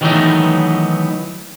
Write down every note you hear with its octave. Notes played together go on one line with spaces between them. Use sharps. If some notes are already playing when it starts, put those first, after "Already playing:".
D#3 E3 F#3 A3 B3 D#4